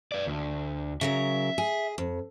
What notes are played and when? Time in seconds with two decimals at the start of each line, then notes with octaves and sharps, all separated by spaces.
0.12 B4 D5
0.27 D2
1.01 C#3 F#3 A#4 E5
1.58 G#4
1.98 F2